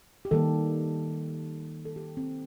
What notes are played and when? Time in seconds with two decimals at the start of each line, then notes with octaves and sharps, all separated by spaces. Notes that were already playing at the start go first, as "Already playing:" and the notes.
0.25 G4
0.31 D#3 G3 A#3 A4
1.85 A4
1.96 G4
2.17 C4